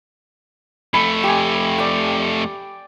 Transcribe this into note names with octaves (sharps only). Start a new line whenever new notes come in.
F2 A3 B5
G4 G#5
D5 G5